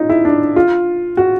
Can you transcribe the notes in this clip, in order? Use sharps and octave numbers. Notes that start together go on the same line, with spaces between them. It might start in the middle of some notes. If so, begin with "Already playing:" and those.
Already playing: C#4 D#4 F4
E4
D4
F4
F#4